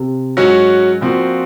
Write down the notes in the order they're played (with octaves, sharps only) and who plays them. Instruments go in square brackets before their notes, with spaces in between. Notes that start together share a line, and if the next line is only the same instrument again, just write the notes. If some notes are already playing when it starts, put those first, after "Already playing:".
Already playing: [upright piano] C3
[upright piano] G#2 [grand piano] F#3 C#4 F#4
[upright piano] A#2 [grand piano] F3 C4 F#4